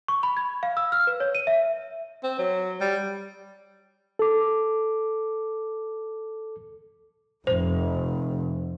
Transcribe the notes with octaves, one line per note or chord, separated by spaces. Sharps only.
C#6
B5
G#6
F5
E6
F6
B4
C#5
D#7
E5
C4
F#3
G3
A4 D6
F1 C5